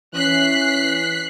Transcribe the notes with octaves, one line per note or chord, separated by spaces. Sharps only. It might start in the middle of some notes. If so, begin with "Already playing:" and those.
E3 C#4 F#6 B6 C7